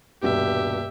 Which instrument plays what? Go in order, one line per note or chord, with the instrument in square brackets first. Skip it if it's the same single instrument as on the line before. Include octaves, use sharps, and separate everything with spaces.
[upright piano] D#1 G2 B2 [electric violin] G4 E5